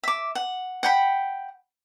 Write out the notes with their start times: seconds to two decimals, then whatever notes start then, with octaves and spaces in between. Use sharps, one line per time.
0.04 E5 D6
0.35 F#5
0.83 F#5 G5 B5